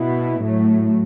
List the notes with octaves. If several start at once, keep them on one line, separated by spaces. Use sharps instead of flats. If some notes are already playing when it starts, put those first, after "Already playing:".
Already playing: B2 B3 E4
A2 F#3 A3